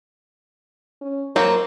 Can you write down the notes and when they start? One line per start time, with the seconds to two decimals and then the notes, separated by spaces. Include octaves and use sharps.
1.02 C#4
1.36 F#3 A#3 C4 A#4